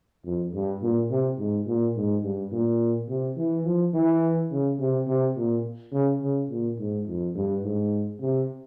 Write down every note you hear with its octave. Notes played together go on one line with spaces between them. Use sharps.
F2
G2
A#2
C3
G#2
A#2
G#2
G2
A#2
C3
E3
F3
E3
C#3
C3
C3
A#2
C#3
C#3
A#2
G#2
F2
G2
G#2
C3